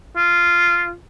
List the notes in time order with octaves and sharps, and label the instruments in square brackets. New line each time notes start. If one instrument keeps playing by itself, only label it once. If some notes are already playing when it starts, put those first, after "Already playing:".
[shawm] F4